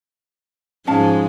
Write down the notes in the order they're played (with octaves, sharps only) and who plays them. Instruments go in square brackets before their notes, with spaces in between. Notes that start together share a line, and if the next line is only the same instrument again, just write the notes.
[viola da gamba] G#2 F3 G#3 [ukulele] C#4 F5 A5